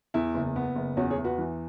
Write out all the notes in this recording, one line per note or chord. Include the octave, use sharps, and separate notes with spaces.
E2 E4
F#1
B3
F#1
E2 C#4 F#4
G#4 C#5
E2
F#4 B4
E3